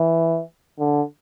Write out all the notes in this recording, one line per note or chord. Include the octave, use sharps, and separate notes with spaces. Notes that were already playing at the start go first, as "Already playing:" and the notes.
Already playing: E3
D3